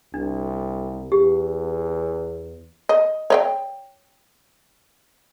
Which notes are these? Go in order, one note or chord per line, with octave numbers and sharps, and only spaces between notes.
C2 D4
E2 G4
D#5
C#5 D#5 G5